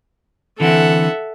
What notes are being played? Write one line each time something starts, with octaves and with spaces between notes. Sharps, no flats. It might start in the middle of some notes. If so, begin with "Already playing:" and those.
D3 E3 C4 A4 E5 F#5